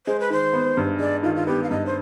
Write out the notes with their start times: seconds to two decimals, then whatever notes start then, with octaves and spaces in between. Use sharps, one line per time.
0.07 G#3 C5
0.20 B4
0.30 D#3 C5
0.53 B3
0.77 G2
1.00 G#3 D5
1.23 D#3 F4
1.36 F4
1.47 B3 G4
1.63 F5
1.70 G2 D#5
1.86 C5